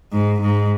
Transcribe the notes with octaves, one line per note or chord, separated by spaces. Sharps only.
G#2
G#2